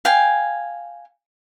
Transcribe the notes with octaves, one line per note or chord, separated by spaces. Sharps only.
F5 G5 G#5